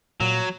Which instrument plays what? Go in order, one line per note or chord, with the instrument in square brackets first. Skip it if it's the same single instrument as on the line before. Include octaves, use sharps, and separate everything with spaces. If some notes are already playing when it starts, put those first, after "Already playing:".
[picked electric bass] A#2 [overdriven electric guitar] F#3